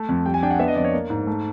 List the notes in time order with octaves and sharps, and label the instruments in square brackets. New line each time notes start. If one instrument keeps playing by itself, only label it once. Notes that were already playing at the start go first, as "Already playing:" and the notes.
Already playing: [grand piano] A3
F2
G3 G5
G#5
D4 G5
F#5
B3 E5
D#5
F2 D5
C#5
A#3
G#2
A3